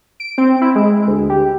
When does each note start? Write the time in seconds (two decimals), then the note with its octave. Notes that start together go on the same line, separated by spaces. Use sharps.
0.20 D7
0.38 C4
0.61 E4
0.75 G#3
1.07 D2
1.29 G4